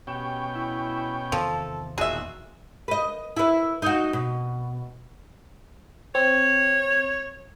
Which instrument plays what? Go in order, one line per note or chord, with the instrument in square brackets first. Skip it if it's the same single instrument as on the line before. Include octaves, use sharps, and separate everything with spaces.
[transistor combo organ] B2 C#4 G5 [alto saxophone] G4
[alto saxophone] E4
[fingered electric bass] E2 C3 D#3 [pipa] F3 [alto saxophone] A4
[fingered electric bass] E1 E2 [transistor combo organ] A#2 D#3 F4 [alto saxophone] F#4 [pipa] G#4 E5
[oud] B4 D#5
E4 B4
D#4 F#4
B2
[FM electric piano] C4 [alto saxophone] C#5